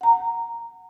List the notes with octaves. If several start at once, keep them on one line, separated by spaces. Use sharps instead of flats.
F#5 A#5